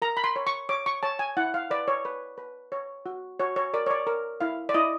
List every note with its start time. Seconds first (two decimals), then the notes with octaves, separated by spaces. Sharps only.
0.02 A#4 A#5
0.17 B5
0.24 C6
0.36 C#5
0.47 C#6
0.69 C#5 D6
0.86 C#6
1.03 C#5 A5
1.19 G#5
1.37 E4 F#5
1.54 F5
1.70 B4 D5
1.88 C#5
2.05 B4
2.38 B4
2.72 C#5
3.06 F#4
3.40 F#4 C#5
3.56 C#5
3.74 A#4 D5
3.86 C#5
3.90 D5
4.07 A#4
4.41 E4 F5
4.69 D5
4.74 E4 D#5